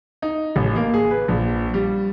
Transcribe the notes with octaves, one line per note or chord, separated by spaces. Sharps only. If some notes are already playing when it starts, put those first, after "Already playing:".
D#4
A1
A#3
G#4
B4
A#1
G3